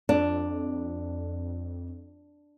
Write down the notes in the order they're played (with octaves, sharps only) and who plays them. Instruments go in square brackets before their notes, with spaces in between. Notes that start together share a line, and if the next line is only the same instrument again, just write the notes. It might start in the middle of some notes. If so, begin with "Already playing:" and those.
[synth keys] F2 [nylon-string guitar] D4